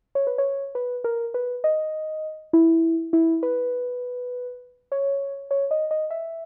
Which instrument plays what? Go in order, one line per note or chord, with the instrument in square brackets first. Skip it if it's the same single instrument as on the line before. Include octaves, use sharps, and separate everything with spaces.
[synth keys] C#5
B4
C#5
B4
A#4
B4
D#5
E4
E4
B4
C#5
C#5
D#5
D#5
E5